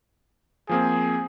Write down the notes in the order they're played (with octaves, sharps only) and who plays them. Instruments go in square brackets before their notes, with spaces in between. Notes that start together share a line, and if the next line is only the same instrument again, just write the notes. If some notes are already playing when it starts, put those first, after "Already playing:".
[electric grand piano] F3 A#3 C4 [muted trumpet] G#4